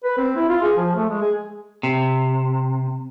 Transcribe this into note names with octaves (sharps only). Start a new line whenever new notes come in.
B4
C4
E4
F4
G#4
F3
A3
G#3
G#4
C3